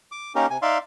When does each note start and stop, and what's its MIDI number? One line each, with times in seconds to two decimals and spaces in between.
0.12 0.33 86
0.35 0.46 58
0.35 0.46 61
0.35 0.46 63
0.35 0.46 67
0.35 0.46 70
0.50 0.57 48
0.50 0.57 80
0.62 0.78 63
0.62 0.78 74
0.62 0.78 76
0.62 0.78 77
0.62 0.78 84